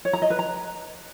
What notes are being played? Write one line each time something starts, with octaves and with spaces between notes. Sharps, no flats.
C#5
A#5
D#5
B4
A#5